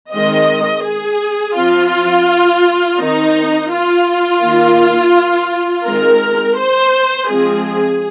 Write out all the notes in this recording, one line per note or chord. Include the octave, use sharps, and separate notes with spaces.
D#3 G#3 C4 D#5
G#4
F3 C4 F4
D#3 C4 D#4
F4
D#3 A#3
D#3 G#3 C4 A#4
C5
F3 G#3 C4 G#4